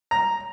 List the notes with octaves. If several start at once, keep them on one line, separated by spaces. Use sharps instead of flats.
A#5